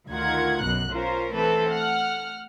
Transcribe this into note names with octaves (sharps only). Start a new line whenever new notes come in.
D2 D#3 F4 A#4 F#5 G#6
B1 F#2 B2 F#6
C#4 F4 A#4 C5
E3 A3 C4 A4 B4
F#5 F6